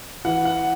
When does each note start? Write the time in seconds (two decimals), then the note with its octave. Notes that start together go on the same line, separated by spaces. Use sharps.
0.25 E3 F#5
0.45 F#5